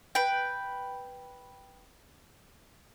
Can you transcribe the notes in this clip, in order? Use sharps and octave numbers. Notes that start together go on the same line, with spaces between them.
B4 G5